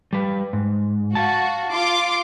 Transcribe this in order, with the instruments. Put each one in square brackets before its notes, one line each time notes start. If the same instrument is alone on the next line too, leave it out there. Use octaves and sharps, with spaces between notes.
[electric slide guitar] G3 B4
G#2
[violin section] F#4 [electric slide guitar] F5 F#5 A5
[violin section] F4 C6 D6